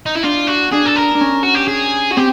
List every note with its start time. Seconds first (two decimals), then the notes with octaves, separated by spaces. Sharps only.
0.06 D#4
0.15 E4
0.23 D4 F4
0.47 F#4
0.72 D4 G#4
0.85 A4
0.96 A#4
1.14 D4
1.21 C#4
1.43 F#4
1.55 G4
1.68 G#4
2.12 F#4
2.16 C4 G4